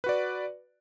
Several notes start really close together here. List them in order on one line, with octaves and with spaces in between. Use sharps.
B4 F#4 D5